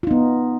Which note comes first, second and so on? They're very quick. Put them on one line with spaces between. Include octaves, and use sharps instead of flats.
F4 D#4 B3